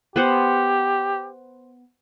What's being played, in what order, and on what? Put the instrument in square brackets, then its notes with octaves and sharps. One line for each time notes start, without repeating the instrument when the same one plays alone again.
[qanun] B3 C5 F#5 [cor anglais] G4